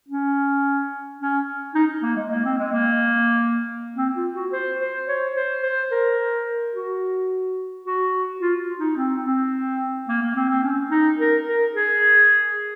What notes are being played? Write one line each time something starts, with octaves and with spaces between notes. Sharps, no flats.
C#4
C#4
D#4
A#3
G#3
A#3
C4
G#3
A#3
C4
F4
F#4
C5
C5
C#5
C5
C5
A#4
F#4
F#4
F4
D#4
C4
C4
A#3
A#3
C4
C4
C#4
D#4
A#4
A#4
G#4